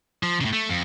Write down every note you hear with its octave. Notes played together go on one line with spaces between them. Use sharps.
F3
A2 C#3
A3
F2